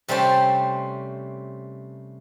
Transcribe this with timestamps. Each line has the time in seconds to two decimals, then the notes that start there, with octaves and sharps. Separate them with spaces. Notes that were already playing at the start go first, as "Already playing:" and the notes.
0.08 C3 G3 A3 C#4 C5 A5